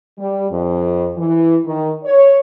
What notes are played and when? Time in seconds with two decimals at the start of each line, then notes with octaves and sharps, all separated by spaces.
0.19 G3
0.50 F2
1.17 E3
1.65 D#3
2.04 C#5